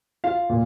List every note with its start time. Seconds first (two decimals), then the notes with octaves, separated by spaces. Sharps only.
0.24 F4 F5
0.50 A#2